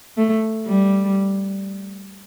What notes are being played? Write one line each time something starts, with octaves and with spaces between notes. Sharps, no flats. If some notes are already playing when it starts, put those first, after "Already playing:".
A3
G3